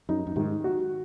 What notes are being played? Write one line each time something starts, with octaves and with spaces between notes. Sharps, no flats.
F#2 D#4
F#2
G#2 D#3
F#4